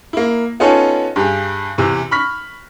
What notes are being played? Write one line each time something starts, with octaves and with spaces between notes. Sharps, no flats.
A#3 E4
B3 C#4 D#4 F4 A4 C#5
G2 G4 G#4
E2 C3 E3
B5 C#6 F6 B6